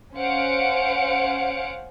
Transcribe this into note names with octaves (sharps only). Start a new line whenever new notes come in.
C#4 C5 F5 F#5 C#7 D7